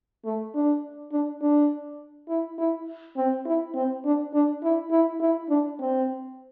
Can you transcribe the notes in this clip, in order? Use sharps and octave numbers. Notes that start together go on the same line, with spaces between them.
A3
D4
D4
D4
E4
E4
C4
E4
C4
D4
D4
E4
E4
E4
D4
C4